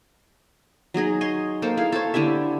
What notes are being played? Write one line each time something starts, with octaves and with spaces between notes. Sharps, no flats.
F#3 D#4 G#4 D#5
C#5 D#5 G#5 C6
A#3 A4 C5
E4 G#4 F5
A4 C5 C#5
D3 E4 G4 E5